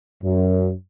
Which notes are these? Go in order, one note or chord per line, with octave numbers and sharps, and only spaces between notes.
F#2